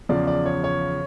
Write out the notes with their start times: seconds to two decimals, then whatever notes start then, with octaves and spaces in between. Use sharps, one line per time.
0.09 E2 C#3 F3 D5
0.27 D5
0.46 C#5
0.64 C#5